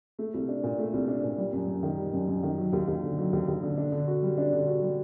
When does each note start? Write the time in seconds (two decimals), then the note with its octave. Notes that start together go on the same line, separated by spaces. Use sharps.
0.19 A3
0.34 C2
0.49 D4
0.63 A#2
0.78 A3
0.93 C2
1.08 D4
1.24 A#2
1.38 G3
1.53 F#2
1.68 F#2
1.83 D#3
1.98 G3
2.13 F#2
2.28 F#2
2.43 D#3
2.58 F#3
2.73 D#2
2.88 D#2
3.03 D3
3.18 F#3
3.33 D#2
3.48 D#2
3.63 D3
3.77 D4
3.92 D3
4.07 F#4
4.23 G3
4.38 D4
4.53 D3
4.67 F#4
4.82 G3